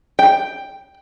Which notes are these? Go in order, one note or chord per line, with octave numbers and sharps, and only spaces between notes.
G5